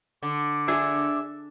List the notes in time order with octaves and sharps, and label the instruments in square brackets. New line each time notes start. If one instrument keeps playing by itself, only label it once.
[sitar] D3 [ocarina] D6
[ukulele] D4 G#4 [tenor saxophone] E5